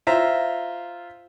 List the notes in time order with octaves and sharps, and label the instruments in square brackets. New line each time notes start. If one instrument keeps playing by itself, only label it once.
[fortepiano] F4 C5 E5 A#5